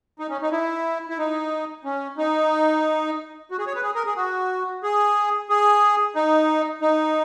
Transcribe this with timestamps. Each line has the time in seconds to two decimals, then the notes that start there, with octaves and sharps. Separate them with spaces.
0.19 D#4
0.30 C#4
0.42 D#4
0.52 E4
1.09 E4
1.18 D#4
1.84 C#4
2.18 D#4
3.51 F#4
3.59 G#4
3.67 C#5
3.75 B4
3.83 G#4
3.95 A#4
4.06 G#4
4.16 F#4
4.83 G#4
5.49 G#4
6.15 D#4
6.82 D#4